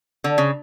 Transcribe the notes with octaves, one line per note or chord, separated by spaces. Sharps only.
D3
C#3